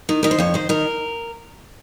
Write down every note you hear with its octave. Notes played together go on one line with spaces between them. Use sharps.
D#3
D#3 A#4
C5
F2 C#5
D#3 C5
D#3 A#4